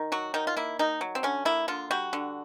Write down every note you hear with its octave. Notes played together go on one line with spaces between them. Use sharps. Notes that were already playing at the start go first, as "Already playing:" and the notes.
Already playing: D#3
F#3 F#4
D#3 D#4
F4
A#3 E4
D#3 D#4
F#3
C4
D3 C#4
A#3 E4
D3 F4
G3 F#4
D3